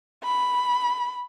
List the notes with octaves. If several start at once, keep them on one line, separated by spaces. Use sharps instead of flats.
B5